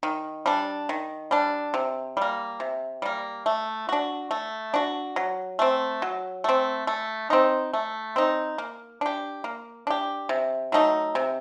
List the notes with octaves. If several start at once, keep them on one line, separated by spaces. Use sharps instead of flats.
D#3
G3 D4
D#3
G3 D4
C3
G3 A#3
C3
G3 A#3
A3
D4 F#4
A3
D4 F#4
F#3
A3 C4
F#3
A3 C4
A3
C4 D#4
A3
C4 D#4
A#3
D4 G4
A#3
D4 G4
C3
F#3 A3 D#4
C3